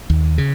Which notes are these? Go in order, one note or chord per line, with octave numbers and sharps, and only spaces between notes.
D#2
C#3